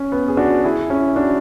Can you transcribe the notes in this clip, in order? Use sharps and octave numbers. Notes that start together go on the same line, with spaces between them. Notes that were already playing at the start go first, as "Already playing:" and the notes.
Already playing: C#4
B3
G#4
D4 F#4
E4 G#4
C#4 E4
D4 F#4